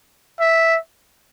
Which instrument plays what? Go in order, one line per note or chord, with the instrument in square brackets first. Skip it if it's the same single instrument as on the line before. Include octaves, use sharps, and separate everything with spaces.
[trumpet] E5